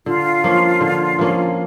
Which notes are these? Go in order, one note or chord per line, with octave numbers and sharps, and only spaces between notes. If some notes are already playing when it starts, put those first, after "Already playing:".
D3 F4
F3 A#3 C#4
D3
F3 A#3 C#4